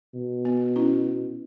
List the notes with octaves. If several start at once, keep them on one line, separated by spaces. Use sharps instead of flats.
B2
B3
C#4 E4